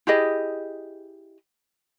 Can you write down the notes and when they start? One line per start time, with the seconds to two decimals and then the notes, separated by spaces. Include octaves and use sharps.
0.07 E4 G4 G#4 D#5